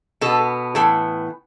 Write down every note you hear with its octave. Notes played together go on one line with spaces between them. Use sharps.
B2 B3 A4
A2 E3 B3 A4